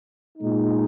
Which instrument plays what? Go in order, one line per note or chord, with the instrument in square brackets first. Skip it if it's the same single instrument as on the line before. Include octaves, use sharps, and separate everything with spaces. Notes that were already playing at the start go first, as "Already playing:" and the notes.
[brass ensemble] A#2 G#3 D#4